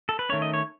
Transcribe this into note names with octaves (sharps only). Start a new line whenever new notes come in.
A4
B4
D#3 A3 C#4 C#5
D#5
C#5